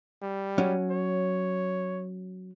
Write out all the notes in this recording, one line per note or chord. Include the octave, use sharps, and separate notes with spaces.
G3
F#3 C#4
C#5